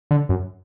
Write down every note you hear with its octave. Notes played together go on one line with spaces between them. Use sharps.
D3
F#2